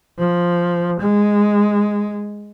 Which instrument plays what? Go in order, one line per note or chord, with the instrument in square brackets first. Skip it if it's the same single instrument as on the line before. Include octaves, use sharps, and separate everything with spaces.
[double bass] F3
G#3